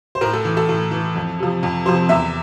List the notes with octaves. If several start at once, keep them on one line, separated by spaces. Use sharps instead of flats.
C5
A2 A#4
A4
E3
A4
A2
E3
F2
C3 F3
F2
C3 F3 C5
E2 E5